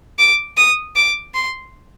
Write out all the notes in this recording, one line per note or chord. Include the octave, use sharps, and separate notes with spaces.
D6
D#6
D6
C6